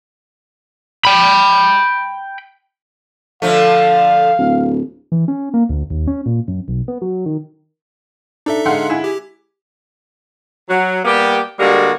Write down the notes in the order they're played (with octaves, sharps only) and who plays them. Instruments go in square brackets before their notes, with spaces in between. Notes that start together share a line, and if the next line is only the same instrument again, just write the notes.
[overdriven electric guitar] G5 B5
[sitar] D3 F3 A3 [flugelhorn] F5
[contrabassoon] D1
[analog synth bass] E3
C#4
A#3
D2
D#2
C#4
A#2
F#2
B1
B3
F#3
D#3
[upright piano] D4 [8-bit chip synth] D#4 A4 E5
[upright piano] D3 G#3 [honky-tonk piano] F5 F#5 C6
[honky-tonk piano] E4 G#4
[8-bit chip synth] G4
[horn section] F#3
G3 A#3 B3 G4
D3 G3 G#3 A#3 F#4